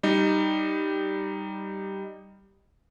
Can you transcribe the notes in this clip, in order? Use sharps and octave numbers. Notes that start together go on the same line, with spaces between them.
G3 D#4